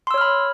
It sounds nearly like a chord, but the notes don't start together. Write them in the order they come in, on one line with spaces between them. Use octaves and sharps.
C6 E6 C#5 F6 B5